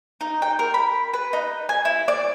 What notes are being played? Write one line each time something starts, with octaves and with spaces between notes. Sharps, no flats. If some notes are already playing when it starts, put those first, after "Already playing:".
D#4
G5
A#4
B5
B4
D#4
G#5
E4
D5